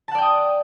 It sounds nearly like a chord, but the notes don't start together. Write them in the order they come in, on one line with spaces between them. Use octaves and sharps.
A5 F#5 D5 G5 D#6